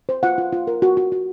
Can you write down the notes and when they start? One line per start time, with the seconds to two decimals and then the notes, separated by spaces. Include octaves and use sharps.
0.09 C5
0.23 F4 F#5
0.38 F4
0.53 F4
0.67 A#4
0.82 F#4
0.97 F#4
1.12 F#4